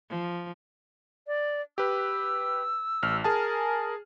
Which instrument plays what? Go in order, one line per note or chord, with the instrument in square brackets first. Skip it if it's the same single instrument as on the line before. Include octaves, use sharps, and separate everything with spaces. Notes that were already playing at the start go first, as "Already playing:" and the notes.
[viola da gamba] F3
[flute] D5
[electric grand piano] G4 B4 [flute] E6
[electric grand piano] A1 F6
[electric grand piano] G#4 G#5 A5 [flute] A#4